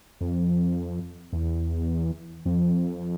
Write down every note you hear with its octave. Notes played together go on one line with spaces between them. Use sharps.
F2
E2
F2